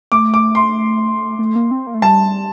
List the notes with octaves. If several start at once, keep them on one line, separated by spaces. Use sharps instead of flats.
A3 D6
D6
C6
A3
A#3
C4
A#3
A3
G3 A5